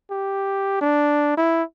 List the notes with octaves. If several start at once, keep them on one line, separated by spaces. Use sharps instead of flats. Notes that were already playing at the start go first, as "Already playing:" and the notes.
G4
D4
E4